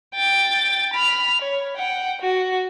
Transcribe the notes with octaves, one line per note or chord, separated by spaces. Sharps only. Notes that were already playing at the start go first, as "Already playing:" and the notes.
G5 A6
B5 F6
C#5
F#5 G5
F#4